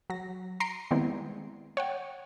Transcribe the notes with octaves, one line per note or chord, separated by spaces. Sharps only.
F#3 A#6
A#5 C6 C7 D7
D#3 G3 G#3 B3 C4 E4
C#5 F#5 G5